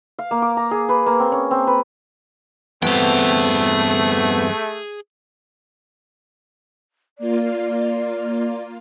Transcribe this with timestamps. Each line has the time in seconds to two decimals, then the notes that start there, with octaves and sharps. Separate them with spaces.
0.19 F5
0.31 A#3
0.42 D6
0.57 A#5
0.71 G#4
0.89 B4
1.06 A#3
1.20 C4
1.32 C#4
1.51 C4
1.67 B4
2.83 E2 G2 A3 B3 C4 G#4 G5
7.18 A#3 F4 D5